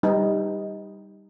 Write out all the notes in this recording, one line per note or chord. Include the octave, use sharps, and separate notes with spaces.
G3 D#4 B4